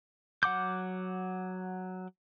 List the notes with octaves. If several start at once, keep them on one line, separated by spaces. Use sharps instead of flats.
F#3 F#5 D6 G6